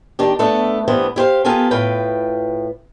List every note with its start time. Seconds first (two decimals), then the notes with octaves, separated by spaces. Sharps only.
0.19 D#3 D4 G4
0.39 A3 B3 D4 A4
0.88 G2 E3 B3 C5
1.16 E4 G4 C5 F5
1.45 B3 F4 G4 A4 A#4 G#5
1.71 A2 F4 B4 G5